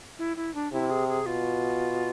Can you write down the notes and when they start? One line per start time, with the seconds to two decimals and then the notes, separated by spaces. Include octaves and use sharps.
0.19 E4
0.37 E4
0.54 D4
0.72 C3 E4
0.90 G#4
1.08 G#4
1.26 B2 F4